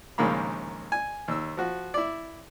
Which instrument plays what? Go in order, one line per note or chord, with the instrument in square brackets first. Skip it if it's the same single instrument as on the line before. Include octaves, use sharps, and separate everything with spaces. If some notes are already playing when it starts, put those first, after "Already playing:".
[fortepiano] A#1 D#2 C#3 G#3 A#3 B5
G#5
D#2 E6
F3 F#4
E4 D5